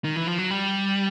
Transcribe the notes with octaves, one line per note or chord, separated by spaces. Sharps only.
D#3
E3
F3
F#3
G3